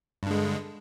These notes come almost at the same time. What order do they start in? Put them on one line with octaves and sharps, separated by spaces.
G2 D3 G#3